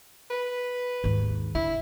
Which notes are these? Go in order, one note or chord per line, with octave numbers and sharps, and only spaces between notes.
B4
D#2 G#2
D3 E4